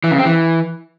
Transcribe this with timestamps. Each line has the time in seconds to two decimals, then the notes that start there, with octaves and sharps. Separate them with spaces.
0.04 E3
0.11 C#3
0.18 C4
0.25 E3